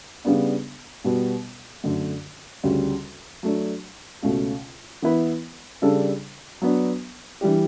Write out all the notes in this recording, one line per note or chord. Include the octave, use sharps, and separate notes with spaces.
C#3 G3 B3 D4
B2 G3 B3
F#2 D3 A3
D2 C#3 G3 C#4
F#3 A3 D4
C#2 B2 A3 C#4
E3 B3 E4 B4
C#3 G3 D4 A4
F#3 B3 D4
E3 G3 D4 G4